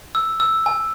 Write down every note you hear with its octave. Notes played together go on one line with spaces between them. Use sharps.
E6
E6
G#5